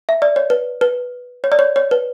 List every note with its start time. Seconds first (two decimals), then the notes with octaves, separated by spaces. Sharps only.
0.09 E5
0.22 D5
0.36 C#5
0.50 B4
0.81 B4
1.44 C#5
1.52 D5
1.59 C#5
1.76 C#5
1.91 B4